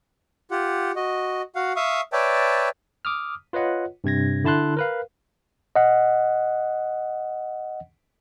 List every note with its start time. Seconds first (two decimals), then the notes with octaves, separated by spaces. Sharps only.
0.51 F4 G4 F#5
0.96 F#4 D#5
1.55 F#4 F5 F#5
1.76 E5 F5 C#6 D#6
2.13 B4 C#5 D5 E5 G5 A5
3.05 D6 D#6 F6
3.53 F4 B4 C#5 D#5 F#5
4.04 G2 C3 G#6 A#6
4.44 D3 E4 A5 C6 F#6
4.77 A#4 B4 F5
5.76 D#5 F#5